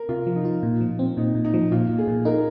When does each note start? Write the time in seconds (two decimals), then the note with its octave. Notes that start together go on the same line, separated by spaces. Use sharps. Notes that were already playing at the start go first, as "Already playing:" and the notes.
Already playing: A#4
0.09 C3 F4
0.26 F3
0.36 D#4
0.45 F4
0.63 A#2
0.81 F3
0.99 C4
1.17 A#2 D#4
1.35 A#2
1.44 D#4
1.54 F3
1.71 A#2 F4
1.89 A#2
1.98 G#4
2.07 A#2
2.25 D#4 A#4